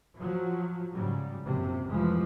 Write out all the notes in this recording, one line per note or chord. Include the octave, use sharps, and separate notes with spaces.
F3 F#3
G#2 C#3 F#3 G3
A#1 F#2 C3
F1 E3 F3 G#3